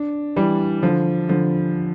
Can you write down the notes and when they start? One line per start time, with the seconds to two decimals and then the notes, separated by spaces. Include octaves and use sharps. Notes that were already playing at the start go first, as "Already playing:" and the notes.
Already playing: D4
0.36 E3 G3
0.83 D3 F3
1.29 D3 F3